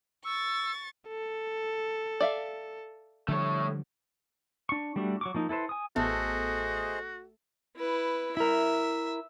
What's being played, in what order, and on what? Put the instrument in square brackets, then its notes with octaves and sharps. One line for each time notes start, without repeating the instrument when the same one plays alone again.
[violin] C#6 A6 [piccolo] E6
[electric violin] A4
[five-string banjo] D5 E5 F5
[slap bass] D3 F3 G3 [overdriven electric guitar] A3 C#5
[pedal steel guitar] D4 C#6
G3 A3 D4 F#4
F#3 C#6 D6
F3 A#3 D#4
E4 A4 B4 C5
G#5 D#6
[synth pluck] A1 B3 A5 [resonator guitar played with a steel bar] A3 [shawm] F#4 [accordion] G#4 C5 D#5
[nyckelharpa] E4 B4
[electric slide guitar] E4 A#4 [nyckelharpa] E5